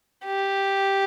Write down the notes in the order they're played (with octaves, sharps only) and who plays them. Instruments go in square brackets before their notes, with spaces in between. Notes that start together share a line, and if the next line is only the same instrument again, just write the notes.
[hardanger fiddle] G4